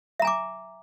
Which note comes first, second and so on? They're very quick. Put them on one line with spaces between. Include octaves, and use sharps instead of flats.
E5 A#5 G#5 D6